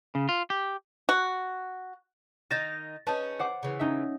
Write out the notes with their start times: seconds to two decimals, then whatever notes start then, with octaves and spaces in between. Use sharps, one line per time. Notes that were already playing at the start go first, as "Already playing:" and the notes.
0.15 C#3
0.29 F4
0.50 G4
1.09 F#4
2.51 D#3 D#4 F5 A6 A#6 E7
3.07 C#4 D#4 G#4 B4 A5
3.39 C5 F#5 D6
3.63 C#3 E3
3.79 C#4 D#4 E5